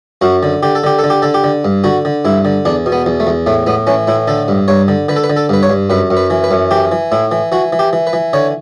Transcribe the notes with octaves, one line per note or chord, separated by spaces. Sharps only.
F#2 F#4
D3
D3 G4
A4
D3 G4
A4
D3
G4
D3 A4
G4
D3
G2
D3 F#4
D3
G2 E4
D3
E2 D4
B2
B3
E2
A3
E2
A2 A3
A2 B3
E3 C#4
A2 E4
D3 A4
G2
G2 C#5
D3
D3 B4
A4
B4
D3
A4
G2 B4
C#5
G2
F#2 B4
F#2
B4
E3
B4
F#2
E3 G4
E3
A2 E4
E3
E3 F#4
E3
G4
E3
B4
E3
D3 C#5